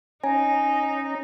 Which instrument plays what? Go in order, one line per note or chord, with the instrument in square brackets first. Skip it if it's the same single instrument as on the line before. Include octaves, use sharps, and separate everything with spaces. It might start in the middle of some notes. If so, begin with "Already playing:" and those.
[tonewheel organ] C#4 A#5 [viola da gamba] D#4 [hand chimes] G#5